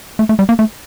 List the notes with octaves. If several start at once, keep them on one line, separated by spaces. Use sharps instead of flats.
A3
A3
G3
A#3
A3